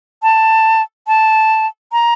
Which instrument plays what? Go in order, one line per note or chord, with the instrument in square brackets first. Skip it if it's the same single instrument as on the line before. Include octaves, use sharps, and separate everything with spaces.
[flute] A5
A5
A#5